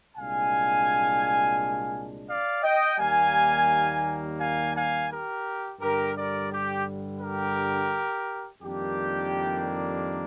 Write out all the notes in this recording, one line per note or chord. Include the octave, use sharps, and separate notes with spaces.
C2 A#2 G#3 D4 F5 G#5
D5 F5
D#5 G5
D#2 D#3 G3 A#3 F5 G#5
F5 G#5
F5 G#5
G4 A#4
G2 D3 G3 G4 A#4
A#4 D5
G4
G4 A#4
F2 D#3 G3 A#3 D4 G4